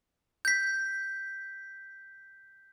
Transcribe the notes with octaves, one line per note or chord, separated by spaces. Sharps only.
G6 B6